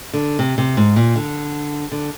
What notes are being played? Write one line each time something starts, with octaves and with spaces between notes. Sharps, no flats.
D3
C3
C3
G#2
A#2
D3
D3